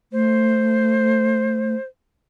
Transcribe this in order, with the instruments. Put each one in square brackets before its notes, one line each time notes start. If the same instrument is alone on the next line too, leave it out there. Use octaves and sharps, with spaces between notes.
[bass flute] A3 [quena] C5